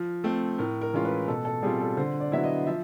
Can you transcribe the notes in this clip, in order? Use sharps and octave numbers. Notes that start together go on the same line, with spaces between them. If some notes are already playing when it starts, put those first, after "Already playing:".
Already playing: F3
A3 C4
A2 A#4
A#4
E3 G#3 C#4 F4
B4
B2 A4
A4
G3 C4 F4 G#4
A4
D3 C5
D5
F#3 B3 E4 E5
D#5
F3 E5